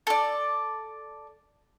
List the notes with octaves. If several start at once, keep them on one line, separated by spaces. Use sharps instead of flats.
A4 D5